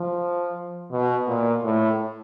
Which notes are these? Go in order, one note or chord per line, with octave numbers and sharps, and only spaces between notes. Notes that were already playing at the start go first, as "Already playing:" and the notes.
Already playing: F3
B2
A#2
A2